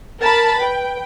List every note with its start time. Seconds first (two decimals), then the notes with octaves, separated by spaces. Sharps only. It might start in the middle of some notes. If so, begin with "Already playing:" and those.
0.20 A#4 A5 B5 A6
0.58 B4 G5